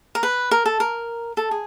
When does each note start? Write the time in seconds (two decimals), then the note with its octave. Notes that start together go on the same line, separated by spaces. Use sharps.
0.15 A#4
0.23 B4
0.51 A#4
0.66 A4
0.80 A#4
1.37 A4
1.51 G#4